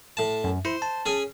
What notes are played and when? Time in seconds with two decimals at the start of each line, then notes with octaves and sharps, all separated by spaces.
0.17 A2 A5
0.44 F#2
0.65 E4 C5
0.82 A5
1.06 C#4 G#4 G#5